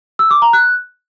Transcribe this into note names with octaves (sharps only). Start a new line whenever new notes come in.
E6
D6
A#5
F#6